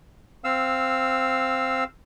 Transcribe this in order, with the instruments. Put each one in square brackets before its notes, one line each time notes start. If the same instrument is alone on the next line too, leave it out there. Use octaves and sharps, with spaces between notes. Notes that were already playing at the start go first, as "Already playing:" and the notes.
[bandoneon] C4 F5 E6